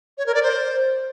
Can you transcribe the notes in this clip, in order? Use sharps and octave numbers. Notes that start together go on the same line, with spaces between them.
C#5
A#4
D5
C5